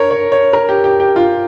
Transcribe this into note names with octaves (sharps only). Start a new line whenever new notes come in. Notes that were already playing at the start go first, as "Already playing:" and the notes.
Already playing: A#4 C#5
C#5
C#5
A#4
G4
G4
G4
F4